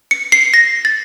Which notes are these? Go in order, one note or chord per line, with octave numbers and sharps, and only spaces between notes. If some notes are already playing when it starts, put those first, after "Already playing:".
C#7
C7
A#6
A6